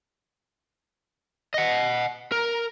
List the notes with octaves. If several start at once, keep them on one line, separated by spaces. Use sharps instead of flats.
D#5 F#5
A#4